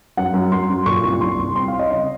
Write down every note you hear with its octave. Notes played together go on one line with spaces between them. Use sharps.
F#2 F#5
F#2
F#2 C6
F#2
A#2 C#6
C2
C2 C6
C2
C4 C6
F5
C4
D#5
C#3 D#5